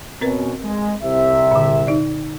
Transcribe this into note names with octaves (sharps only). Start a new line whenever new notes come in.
B2 C4 C#4 A#4 B4
G#3
C2 C3 E5
A#2 D3
D#4 D5